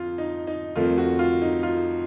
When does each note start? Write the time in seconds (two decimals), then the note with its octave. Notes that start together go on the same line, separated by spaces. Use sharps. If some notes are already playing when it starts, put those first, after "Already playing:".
Already playing: F2 F4
0.18 D#4
0.47 D#4
0.76 F2 D#3 A3 C4 F4
0.98 F#4
1.19 F4
1.42 D#4
1.63 F4